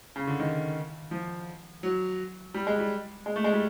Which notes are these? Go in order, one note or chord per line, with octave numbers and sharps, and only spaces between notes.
C#3
D3
D#3
F3
F#3
G3
G#3
G3
G#3
A3
G#3
G3